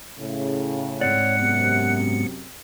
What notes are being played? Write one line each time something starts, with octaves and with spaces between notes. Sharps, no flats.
A2 C#3
G#2 C4 C#5 D5 F#5
F#2 C3 B3 C#7